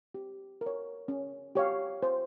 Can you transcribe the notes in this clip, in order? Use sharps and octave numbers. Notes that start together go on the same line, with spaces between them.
G4
A#4
C#5
C#4
G4 C#5 F5
C5